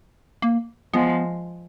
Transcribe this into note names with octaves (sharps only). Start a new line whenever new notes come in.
A#3
F3 G#3 B3